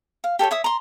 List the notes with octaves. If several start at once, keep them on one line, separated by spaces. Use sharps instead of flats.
F5
G4 A4 C#5 G5
C#5 E5 D#6
A#5 C6